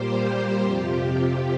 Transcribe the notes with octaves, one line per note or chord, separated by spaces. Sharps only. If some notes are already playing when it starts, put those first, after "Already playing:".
Already playing: A#2 G3 A#3 G4 C5
G4
F2 C3 F3